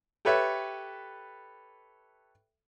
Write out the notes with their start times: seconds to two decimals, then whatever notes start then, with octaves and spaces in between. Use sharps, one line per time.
0.25 G4 A4 B4 C#5 E5